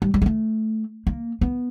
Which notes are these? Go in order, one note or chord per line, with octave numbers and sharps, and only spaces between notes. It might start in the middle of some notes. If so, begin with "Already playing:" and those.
G3
G3
G#3
A3
A#3
B3